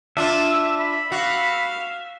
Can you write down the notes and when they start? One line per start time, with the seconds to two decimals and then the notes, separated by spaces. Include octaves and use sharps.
0.17 D4 F4 E5
0.80 B5
1.12 F#4 F5